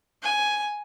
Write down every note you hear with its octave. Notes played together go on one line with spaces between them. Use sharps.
G#5